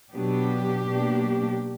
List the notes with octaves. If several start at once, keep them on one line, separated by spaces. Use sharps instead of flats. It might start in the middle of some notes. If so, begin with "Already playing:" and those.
B2 F#3 B3 D4 G4
B2 F#3 A#3 D4